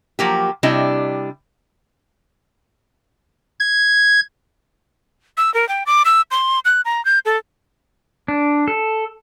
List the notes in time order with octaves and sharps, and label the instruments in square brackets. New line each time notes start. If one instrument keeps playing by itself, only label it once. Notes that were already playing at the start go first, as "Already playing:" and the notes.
[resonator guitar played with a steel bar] F3 F#3 A#3 G4
C3 G3 D4 E4 D#5
[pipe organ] G#6
[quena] E6
A#4
G5
D6
E6
C6
F#6
A#5
G6
A4
[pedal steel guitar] D4
A4